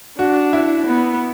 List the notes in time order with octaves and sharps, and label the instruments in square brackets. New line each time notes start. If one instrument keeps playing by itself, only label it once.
[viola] D4 [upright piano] F#4
[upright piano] E4
[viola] B3